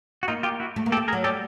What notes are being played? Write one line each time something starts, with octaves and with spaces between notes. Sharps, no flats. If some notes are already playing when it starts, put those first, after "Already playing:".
F#4
A#3 D#4 F4
F4 G4
E4 F#4
A3
A#3
G4 A4
A3
G#4 A#4
F#3
G3 G4 A4